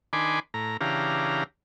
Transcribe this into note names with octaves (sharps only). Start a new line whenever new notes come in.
D#3 D4 G#5 B5 C6 D6
A2 A#5
C#3 E3 D4 G4 F5 A#5